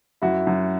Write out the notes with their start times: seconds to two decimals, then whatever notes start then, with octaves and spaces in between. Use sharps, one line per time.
0.22 F#2 E4 F#4
0.47 F#2